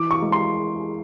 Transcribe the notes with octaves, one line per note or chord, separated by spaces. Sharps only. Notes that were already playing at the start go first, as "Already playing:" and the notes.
Already playing: E3 D6
C#6
G#3
C6